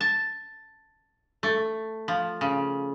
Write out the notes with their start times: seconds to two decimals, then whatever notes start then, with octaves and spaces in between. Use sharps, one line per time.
0.01 A5
1.43 A3
2.08 F3
2.41 C#3